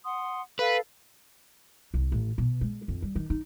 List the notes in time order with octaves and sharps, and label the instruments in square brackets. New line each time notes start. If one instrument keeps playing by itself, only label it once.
[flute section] F#5 C6 D#6
[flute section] A4 F5 [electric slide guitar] B4
[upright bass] C2
A1
B2
G#3
F2
G3
D#3
D#4